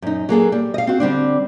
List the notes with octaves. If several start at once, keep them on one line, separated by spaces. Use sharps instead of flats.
F#2 D#4
F#3 A#3 G#4 A4
G3
D#5 F5
C4 F#4
D3 G3 C4 D4